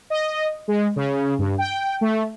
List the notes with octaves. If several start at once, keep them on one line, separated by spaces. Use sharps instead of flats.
D#5
G#3
C#3
G2
G5
A3